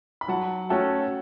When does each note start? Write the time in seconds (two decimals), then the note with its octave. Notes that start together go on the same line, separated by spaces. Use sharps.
0.21 B5
0.28 F#3 F#5 A5
0.69 A3 C#4 F#4 A4 E5 G5